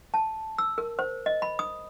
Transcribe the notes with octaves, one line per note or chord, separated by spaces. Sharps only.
A5
E6
A#4
C5
D#5
B5
D#6